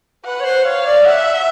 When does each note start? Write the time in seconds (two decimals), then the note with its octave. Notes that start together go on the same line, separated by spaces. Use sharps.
0.25 B4 F#5
0.40 C#5
0.44 C5
0.65 C#5 F5
0.86 D5
1.05 E5 F#5